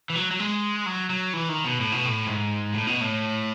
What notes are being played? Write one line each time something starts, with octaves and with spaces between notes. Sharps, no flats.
E3
F#3
F#3
G#3
F#3
F#3
E3
D#3
B2
A2
B2
A2
G#2
A2
B2
A2